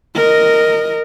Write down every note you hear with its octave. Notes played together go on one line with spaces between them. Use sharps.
A#4 D#5